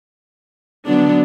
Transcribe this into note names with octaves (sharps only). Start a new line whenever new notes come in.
D3 F#3 B3 D4